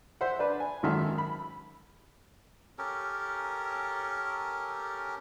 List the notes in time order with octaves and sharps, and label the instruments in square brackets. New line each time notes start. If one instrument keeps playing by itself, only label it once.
[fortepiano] C5 E5 F#5
D4 B4
G#5
G#1 F#2 D#3 A4 E5 C6
B5
[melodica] C#4 G4 A4 A#4